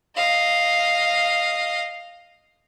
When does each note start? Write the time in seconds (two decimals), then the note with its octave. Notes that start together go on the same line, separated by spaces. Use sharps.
0.16 D#5 F5